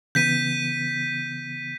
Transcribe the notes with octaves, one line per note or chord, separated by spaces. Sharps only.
C#3 E3 B3 G6 B6 D#7